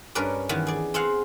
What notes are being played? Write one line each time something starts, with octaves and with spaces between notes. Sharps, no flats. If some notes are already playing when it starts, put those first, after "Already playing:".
G2 C#4 A#4 B4 D5
D#3 E3 B3
G#4 D5
C4 G#4 F5 F#5